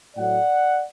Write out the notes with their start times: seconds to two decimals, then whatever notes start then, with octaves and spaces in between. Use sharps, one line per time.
0.17 A2 F#3 A3 D5 F#5